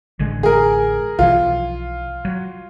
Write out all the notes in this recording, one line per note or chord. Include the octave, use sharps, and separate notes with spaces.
A1 D3 G#3
G#4 A#4
B1 E3 F3 F4
F#3